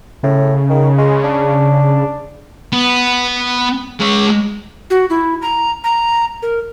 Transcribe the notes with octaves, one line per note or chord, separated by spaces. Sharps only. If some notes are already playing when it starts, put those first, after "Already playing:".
A2 C#3
D#3
G#3
D4
B3
G#3 C#5
F#4
E4
A#5
A#5
A#4